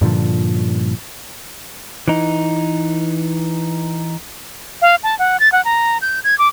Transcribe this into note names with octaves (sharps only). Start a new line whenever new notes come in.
G2 A#2 D3 F3
E3 D#4
F5
A5
F#5
A6
F#5
A#5
G6
G#6
D6